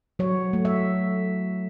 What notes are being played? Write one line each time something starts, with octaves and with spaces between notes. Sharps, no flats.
F#3 C#5
A3
E5